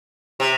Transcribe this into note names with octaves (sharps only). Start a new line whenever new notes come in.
C3